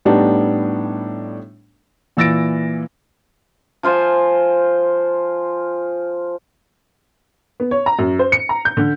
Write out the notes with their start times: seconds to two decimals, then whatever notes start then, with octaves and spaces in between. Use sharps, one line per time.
0.05 A2 G3 B3 D4 D#4
2.17 A#2 E3 E6 A6 A#6 D7
3.83 F3 F4 C5 G#5
7.60 B3
7.71 C#5
7.86 A#5
7.99 F#2
8.19 C5
8.32 C#7
8.49 A#5
8.65 G6
8.77 D3